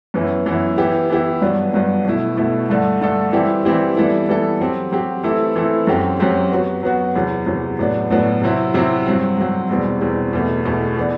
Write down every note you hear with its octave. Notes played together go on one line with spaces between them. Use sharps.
F#2 E3 B3 E4
F#2 E3 B3 E4
E3 B3 E4 G4
E3 B3 E4 G4
G2 F#3 B3 D4
G2 F#3 B3 D4
B2 A3 E4
B2 A3 E4
G2 D3 A3 D4 A4
G2 D3 A3 D4 A4
E3 G3 C4 E4 G4
E3 G3 C4 E4 G4
E3 G3 B3 E4 A4
E3 G3 B3 E4 A4
F#3 C4 G4
F#3 C4 G4
E3 A3 C4 E4 A4
E3 A3 C4 E4 A4
F#2 F#3 C4 G4
F#2 F#3 C4 G4
F#3 B3 F#4
F#3 B3 F#4
E2 C3 F#3
E2 C3 F#3
A2 F#3 B3 D4
A2 F#3 B3 D4
C3 F#3 C4 E4
C3 F#3 C4 E4
G2 F#3 C4
G2 F#3 C4
E2 B2 G3 C4
E2 B2 G3 C4
E2 B2 A3
E2 B2 A3
E3 B3 D4